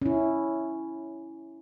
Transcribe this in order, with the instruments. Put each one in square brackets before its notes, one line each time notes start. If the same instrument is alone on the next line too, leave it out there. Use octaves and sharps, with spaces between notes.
[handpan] C#4 E4